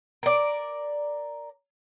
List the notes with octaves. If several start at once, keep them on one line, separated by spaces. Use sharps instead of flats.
A#4 D5